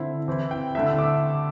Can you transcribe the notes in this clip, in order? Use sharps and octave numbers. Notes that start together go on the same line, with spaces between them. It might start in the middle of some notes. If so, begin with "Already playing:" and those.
Already playing: D3 C4 E4
E3 C4 E4
G5
D3 A3 E4 E5
E6
D6